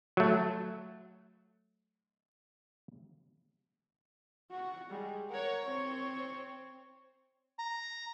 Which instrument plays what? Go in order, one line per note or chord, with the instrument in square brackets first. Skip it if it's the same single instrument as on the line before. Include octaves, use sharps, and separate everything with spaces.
[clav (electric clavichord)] F#3 A3
[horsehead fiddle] F#4 F#5
G3 G#3
[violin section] A#4 C#5 [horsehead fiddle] F#5
[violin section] C4 [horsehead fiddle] C#5
[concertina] A#5